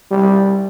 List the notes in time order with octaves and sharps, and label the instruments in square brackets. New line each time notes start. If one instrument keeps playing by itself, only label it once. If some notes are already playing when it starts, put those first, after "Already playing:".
[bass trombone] G3